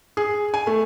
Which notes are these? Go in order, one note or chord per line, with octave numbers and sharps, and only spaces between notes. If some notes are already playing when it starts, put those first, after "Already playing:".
G#4
G#5
A3